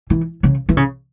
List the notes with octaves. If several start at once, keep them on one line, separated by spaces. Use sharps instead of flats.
E3
C#3
E3
C#3